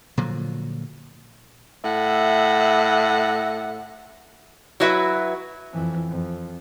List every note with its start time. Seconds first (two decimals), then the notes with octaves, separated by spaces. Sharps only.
0.17 A#2 D3 F3 F#3
1.84 A2 E5 F#5
4.80 F#3 E4 F#4 B4 E5
5.73 F2 E3
6.09 F2